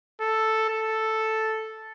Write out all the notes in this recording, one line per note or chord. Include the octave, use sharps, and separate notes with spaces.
A4
A4